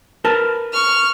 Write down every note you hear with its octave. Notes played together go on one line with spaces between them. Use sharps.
A#4 B4 A5
C#6 F6